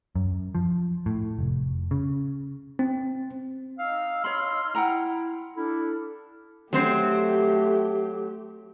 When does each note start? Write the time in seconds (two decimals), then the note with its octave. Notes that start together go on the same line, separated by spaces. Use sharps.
0.15 F#2
0.55 F3
1.06 A2
1.39 F1
1.91 C#3
2.79 C4
3.79 D#4 F5 E6 F6
4.24 C#5 B5 C6
4.75 E4 F#5 G5 A#5
5.57 D4 E4 A4 F6
6.73 F#3 A3 C4 G4 C5